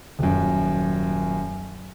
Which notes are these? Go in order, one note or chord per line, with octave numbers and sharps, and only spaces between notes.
D#1 F#2